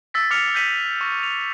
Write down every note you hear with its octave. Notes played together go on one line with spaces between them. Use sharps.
E6 A6 B6
D6 E6 F6 C#7 F7
E6 G6 A#6 B6 D#7 F#7
C#6 A#6
D#7 F7